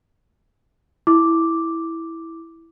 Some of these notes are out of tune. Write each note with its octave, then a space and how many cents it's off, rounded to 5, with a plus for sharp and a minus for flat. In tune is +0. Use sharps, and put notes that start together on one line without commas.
E4 -5 D6 +0